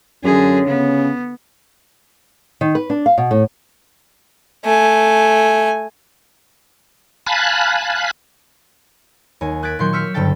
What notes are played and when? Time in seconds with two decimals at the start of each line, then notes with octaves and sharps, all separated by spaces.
0.24 F#2 D3 C#4 G#4
0.67 C#3 B3
2.61 D#3
2.75 B4
2.90 D4
3.06 F5
3.18 B2
3.31 A2
4.65 A3 G#5
7.27 F5 G#5 A5 B5 F#6
9.41 D#2 C#5 G#5
9.63 D#6 F#6 G#6 A6 B6 D7
9.79 A#2 D#3 F#3 C6 C#6 G6
9.93 C#6 E6 F6 G6 B6 C#7
10.14 F#1 G2 D3 A4 G5 A6